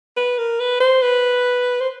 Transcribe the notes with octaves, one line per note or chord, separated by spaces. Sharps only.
B4
A#4
B4
C5
B4
C5